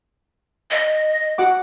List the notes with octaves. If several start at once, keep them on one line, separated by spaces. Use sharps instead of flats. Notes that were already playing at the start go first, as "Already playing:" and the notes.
D#5
F#4 F#5 D6